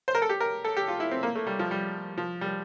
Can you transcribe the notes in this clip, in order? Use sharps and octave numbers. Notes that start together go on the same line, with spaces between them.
C5
A#4
A4
G4
A#4
A4
G4
F4
E4
C4
A#3
A3
G3
F3
G3
F3
G3